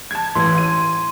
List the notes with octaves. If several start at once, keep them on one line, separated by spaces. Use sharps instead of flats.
A5 G#6
A1 E3 C6 G#6
D#7